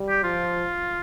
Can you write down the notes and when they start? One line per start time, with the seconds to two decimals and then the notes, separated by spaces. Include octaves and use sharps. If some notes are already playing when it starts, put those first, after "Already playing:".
Already playing: G3
0.09 G4
0.24 F3 F4